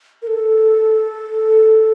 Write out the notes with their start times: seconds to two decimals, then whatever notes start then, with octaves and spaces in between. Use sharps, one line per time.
0.22 A#4
0.27 A4